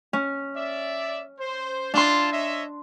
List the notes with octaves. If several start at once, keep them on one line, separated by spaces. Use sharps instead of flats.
C#4
D5 E5
C5
D4 E4 F4 A5 C6
C#5 D#5 E5